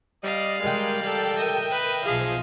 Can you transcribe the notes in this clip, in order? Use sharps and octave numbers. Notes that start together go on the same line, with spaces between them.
G3 D5 D#5 F5
G#3 A#4 G5
A4
D#5 E5
B4
B1 F3 G#4 F5